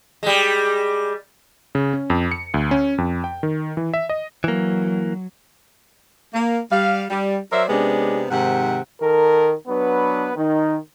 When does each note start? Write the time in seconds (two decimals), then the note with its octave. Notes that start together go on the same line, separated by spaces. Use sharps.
0.23 G3 G#3
1.75 C#3
1.93 C#4
2.10 F2
2.32 C#7
2.54 D2
2.71 C#4
2.98 F2
3.24 G5
3.43 D#3
3.77 E3
3.94 E5
4.09 D#5
4.44 E3 F#3 A#3
6.33 A#3
6.72 G3 F5
7.10 G3
7.52 F#3 A#4 C5 D5 E5
7.69 C3 G#3 B3 C#4 D4 G4
8.31 G#2 C3 D#3 F#5
9.01 D#3 A4 A#4
9.67 F#3 B3 D4 B4
10.37 D#3 D#4